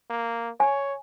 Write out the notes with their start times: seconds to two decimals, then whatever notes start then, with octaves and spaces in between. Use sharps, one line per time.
0.10 A#3
0.60 C#5 G#5